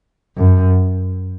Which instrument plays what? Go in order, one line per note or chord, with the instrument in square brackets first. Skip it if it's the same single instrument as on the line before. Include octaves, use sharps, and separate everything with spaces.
[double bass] F#2